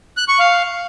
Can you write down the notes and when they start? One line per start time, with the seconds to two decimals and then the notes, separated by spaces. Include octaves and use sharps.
0.17 F#6
0.28 C#6
0.39 F5